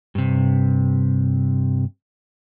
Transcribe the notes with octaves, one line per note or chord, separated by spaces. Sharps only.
G2 C3